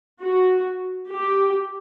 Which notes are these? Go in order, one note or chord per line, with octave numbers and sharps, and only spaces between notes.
F#4
G4